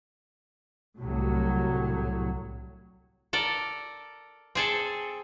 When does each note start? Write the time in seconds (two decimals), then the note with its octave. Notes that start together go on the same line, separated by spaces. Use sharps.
0.99 C2 A2 F#3
3.33 A4 A#4 D5
4.55 C4 G#4 A4